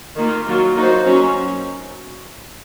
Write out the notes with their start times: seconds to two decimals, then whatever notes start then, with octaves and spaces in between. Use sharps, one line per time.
0.16 D#3 A#3 F4
0.46 F#3 A#3 F4
0.76 A#3 D#4 F#4 C5
1.05 F#3 C#4 F#4 C#5